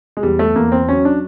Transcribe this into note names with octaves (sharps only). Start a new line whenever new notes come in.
G#3
E2 G3
A3
E2 A#3
C4
F#3 C#4
D4